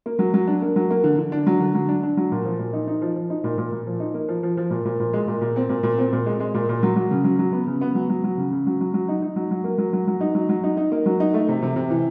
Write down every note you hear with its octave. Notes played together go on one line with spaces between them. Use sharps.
A#3
F#3
F#3
D4
A#3
F#3
A#3
D3
D3
D4
F#3
D3
F#3
D4
D4
F#3
A#2
F3
A#2
D#4
D#4
F3
F3
D#4
A#2
A#2
A#2
F3
D#4
A#3
F3
F3
F3
A#2
A#2
A#2
G#3
A#2
A#2
C4
A#2
A#2
C4
A#2
G#3
G#3
A#2
A#2
F#3
F#3
C#3
F#3
F#3
B3
C#3
B3
F#3
F#3
F#3
C#3
C#3
F#3
F#3
F#3
D#4
D#4
F#3
F#3
A#3
F#3
F#3
F#3
D#4
F#3
F#3
D#4
D#4
A#3
F#3
D#4
A3
C3
C3
C3
E3